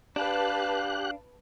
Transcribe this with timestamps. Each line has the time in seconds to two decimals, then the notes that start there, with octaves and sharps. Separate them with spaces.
0.16 D4 G4 B4 F5 A5 F#6